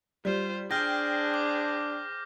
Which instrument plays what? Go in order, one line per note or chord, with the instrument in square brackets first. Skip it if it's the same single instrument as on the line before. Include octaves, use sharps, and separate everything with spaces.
[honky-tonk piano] G3 [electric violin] F4 C5
[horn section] D4 [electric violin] G#4 C5 [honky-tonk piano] G5 [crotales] F6 G6 A#6
[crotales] D6